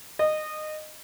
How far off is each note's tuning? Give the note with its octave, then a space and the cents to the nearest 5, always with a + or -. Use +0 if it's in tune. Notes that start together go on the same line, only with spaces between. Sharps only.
D#5 -15